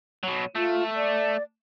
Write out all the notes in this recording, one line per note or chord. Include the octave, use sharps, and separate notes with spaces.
B2 F#3
A3 F4
D5